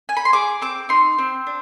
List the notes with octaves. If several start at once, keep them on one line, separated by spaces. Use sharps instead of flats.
G#5
B5
C6
G#4 D6
C4 D6
D#4 C6
C4
D4